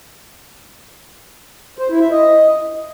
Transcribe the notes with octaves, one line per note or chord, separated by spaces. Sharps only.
C5
E4
E5
D#5